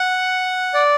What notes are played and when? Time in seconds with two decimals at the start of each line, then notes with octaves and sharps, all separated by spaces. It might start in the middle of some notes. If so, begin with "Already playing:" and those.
Already playing: F#5
0.74 D5